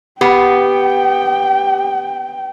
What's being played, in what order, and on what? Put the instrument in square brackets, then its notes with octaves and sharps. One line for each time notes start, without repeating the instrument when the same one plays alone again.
[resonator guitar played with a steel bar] B3 [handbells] G4 [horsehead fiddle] G5